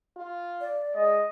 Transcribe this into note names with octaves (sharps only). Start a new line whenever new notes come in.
F4
D5
G#3 D#5